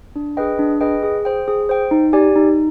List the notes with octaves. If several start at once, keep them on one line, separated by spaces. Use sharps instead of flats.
D4
G#4 B4 D#5 G5
D4
G#4 B4 D#5 G5
G#4
C5 G5
G#4
C5 G5
D#4
G4 D5 G#5
D#4